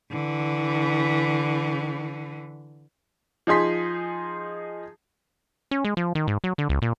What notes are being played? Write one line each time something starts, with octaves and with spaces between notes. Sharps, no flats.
D3 E3
F3 D#4 G#4 C6 B6
C#4
G#3
F3
D#3
G#2
F#3
D3
C#2
A#2